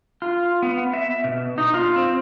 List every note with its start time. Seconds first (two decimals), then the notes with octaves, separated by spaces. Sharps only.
0.22 F4
0.62 B3
0.94 E5
1.24 B2
1.58 D#4
1.74 F4
1.96 C4